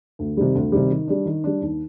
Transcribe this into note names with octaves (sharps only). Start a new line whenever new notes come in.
D2
C3 D#3 G3
D2
C3 D#3 G3
D#3
G3 D4
D#3
G3 D4
D#2